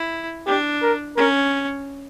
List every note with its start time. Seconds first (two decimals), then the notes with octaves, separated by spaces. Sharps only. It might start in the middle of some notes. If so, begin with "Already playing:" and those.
Already playing: E4
0.47 D4 G4
0.82 A#4
1.17 C#4 A#4